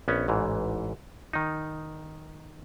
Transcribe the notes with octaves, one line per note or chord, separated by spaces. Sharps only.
A#1 B3 C#4
A1 G#2 E3
D#3 D#4